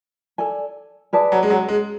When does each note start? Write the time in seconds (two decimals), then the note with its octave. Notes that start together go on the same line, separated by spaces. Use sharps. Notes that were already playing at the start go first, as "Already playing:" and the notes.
0.38 A4 D5 G#5
1.13 G#4 B4 D5 A5
1.32 F#3
1.43 G#3
1.50 F#3
1.68 G#3